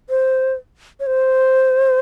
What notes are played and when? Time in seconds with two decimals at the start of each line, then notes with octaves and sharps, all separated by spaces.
0.10 C5
1.00 C#5
1.07 C5